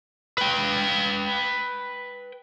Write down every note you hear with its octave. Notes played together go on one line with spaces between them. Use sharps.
B4 G5